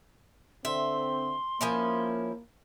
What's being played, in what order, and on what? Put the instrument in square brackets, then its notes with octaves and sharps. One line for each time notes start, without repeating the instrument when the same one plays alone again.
[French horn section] D3 C4 [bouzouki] E5 [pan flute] C6
[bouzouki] F3 C#4 E4 [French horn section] A#3